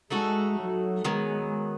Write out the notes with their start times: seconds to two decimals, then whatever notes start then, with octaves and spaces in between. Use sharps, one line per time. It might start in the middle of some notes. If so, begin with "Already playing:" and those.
0.10 G#3 A3 D#4 F#4 A4
0.57 F#3
1.04 D#3 F#3 G#3 B3